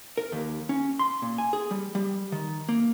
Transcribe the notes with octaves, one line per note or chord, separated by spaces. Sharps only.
A#4
D#2
C#4
C6
A#2
G#5
G#4
G3
G3
D#3
A#3